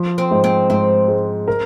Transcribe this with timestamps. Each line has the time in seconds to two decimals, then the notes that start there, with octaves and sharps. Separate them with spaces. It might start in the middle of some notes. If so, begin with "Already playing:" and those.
Already playing: F3
0.18 C4
0.31 G#2
0.44 C4
0.70 G#2 C4
1.08 G#3
1.48 A#4